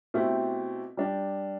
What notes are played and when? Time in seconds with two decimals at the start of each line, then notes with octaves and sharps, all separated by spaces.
0.14 B2 A3 C4 E4 G4
0.97 G3 D4 G4